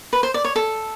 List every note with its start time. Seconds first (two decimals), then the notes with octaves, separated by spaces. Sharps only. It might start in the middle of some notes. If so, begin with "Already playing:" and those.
0.13 B4
0.23 C5
0.34 D5
0.44 C#5
0.56 A4